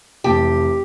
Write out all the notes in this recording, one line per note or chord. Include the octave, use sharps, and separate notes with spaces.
F1 E3 G4 A5